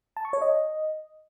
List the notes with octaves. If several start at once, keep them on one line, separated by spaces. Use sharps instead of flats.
A5
C#6
C#5
D#5